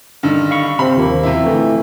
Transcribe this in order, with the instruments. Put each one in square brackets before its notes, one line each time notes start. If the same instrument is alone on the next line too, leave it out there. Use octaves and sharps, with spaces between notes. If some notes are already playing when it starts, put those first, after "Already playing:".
[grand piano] G2 D3 D#3
[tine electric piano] F5 B5 C#6
[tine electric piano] C3 C4 [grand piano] B5
[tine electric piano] D#2 F3 A#3
[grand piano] C3 E4
[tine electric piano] D3 E3 A3